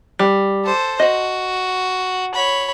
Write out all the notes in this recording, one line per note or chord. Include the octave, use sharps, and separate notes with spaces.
G3
A4 C5
F#4 D#5
C#5 B5